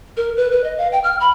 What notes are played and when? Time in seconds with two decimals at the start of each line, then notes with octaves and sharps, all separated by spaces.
0.17 A#4
0.37 B4
0.51 B4
0.64 D#5
0.78 F5
0.92 G5
1.04 F6
1.20 B5